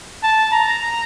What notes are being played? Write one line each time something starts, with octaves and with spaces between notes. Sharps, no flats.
A5
A#5